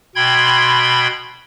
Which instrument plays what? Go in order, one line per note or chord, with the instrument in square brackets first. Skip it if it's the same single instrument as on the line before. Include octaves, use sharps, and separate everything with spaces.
[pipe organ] B2 G5 B5 C6 G#6